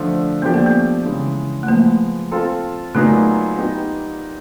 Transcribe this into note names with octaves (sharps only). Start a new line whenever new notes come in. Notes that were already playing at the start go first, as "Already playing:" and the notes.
Already playing: D3 F3 A3
F3 A3 B3 D4 G4
A#3
B3
C#3 E3 G#3
A3
F3 G#3 A#3 B3
C4 F4 A4
A#2 F#3 A3 B3 D#4 G#4
B3 D#4 G4